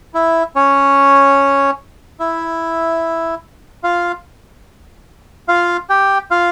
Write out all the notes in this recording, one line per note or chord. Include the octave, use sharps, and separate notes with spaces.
E4 E5
C#4 C#5
E4 E5
F4 F5
F4 F5
G4 G5
F4 F5